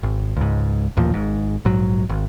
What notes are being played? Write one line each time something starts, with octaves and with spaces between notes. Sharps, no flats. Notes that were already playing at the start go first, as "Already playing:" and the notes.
G#1
C#2 G#2
A1 D#2 A#2 F3
G#1 G#2
A#1 G#2 F#3
G#1